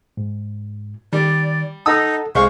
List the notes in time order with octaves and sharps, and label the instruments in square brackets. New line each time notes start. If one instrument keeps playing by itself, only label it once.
[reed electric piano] G#2
[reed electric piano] D#3 [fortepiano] G3 [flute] D5
[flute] D#4 [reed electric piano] A4 F#5 A5 [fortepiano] D#6 E6
[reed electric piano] C2 [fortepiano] G#3 C5 F5 [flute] C#6